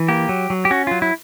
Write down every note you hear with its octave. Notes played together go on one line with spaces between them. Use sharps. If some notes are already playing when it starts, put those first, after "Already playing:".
Already playing: E3
A#3 G4
F#3
F#3
G4
C#4 F#4
F#3 F4
E4